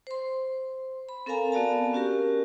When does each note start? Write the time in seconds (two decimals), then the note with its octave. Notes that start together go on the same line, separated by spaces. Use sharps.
0.07 C5 C6
1.09 B5
1.26 C4 A4 A#4 F5 G#5 A#5
1.52 B3 F#4 D5 F5 A5
1.93 C#4 F#4 G4 A#4